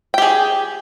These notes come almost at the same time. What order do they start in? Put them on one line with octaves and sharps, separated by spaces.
G5 G4 G#4